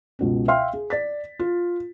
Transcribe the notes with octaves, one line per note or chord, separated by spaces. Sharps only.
C#2 B2 C#4
E5 F5 G5 C6 F6
G#4
D5 A6 B6
F4